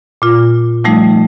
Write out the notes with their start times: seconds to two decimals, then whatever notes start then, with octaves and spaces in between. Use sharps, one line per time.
0.22 A#2 F4
0.84 F3 G3 A3 D#4